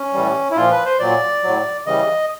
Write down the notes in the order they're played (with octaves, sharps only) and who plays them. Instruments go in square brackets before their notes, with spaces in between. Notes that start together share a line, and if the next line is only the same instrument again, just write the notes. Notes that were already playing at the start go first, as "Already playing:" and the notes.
Already playing: [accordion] C#4
A2 E3 G3
E4
A#2 F3 F4
B4
C5
A#2 F#3 D5
A2 F#3
C#3 E3 G3 D#5